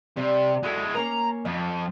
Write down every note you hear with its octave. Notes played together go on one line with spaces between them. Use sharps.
C3 G3
G#3 E4 F#4 A4
A#3 C#4 A#4 A#5
F2 D#5